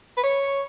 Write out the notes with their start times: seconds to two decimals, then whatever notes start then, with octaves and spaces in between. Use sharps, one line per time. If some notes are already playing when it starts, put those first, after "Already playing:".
0.17 B4
0.23 C#5